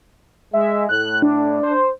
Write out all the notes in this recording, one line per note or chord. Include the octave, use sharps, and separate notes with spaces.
G#3 E5
A2 F#6
D4
C5